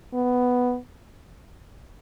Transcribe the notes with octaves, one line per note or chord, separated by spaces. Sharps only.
B3